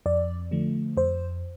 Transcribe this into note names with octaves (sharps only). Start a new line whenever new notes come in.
F2 D5
D3 F3 A3
F2 C5